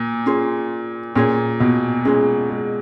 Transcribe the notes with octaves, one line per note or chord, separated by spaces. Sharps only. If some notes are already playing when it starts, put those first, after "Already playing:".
Already playing: A#2
C#4 F4 G#4 C#5
A#2 C#4 F4 G#4 C#5
B2
G#3 C#4 F4 G#4 C#5
G#3